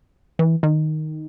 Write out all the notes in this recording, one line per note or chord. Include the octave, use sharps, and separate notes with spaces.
E3
D#3